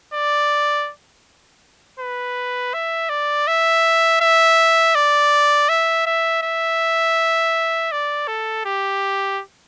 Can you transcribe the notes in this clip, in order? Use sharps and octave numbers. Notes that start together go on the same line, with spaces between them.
D5
B4
E5
D5
E5
E5
D5
E5
E5
E5
D5
A4
G4